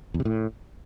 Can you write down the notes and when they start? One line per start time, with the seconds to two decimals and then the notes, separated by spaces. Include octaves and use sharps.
0.14 E2
0.20 C3
0.25 A2